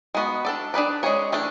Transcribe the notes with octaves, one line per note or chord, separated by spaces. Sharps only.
G#3 B3 F#4
D4 A4 D5
D4 G#4 B4 D5
G#3 C#4 G#4 C#5
E3 A3 D4